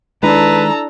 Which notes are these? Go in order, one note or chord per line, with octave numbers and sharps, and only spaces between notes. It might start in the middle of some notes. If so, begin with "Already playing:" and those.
D#3 G#3 D4 E4 A4 B4 A#5